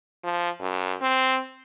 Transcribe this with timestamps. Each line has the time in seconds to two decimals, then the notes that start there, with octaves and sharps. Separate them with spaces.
0.24 F3
0.61 F#2
1.01 C4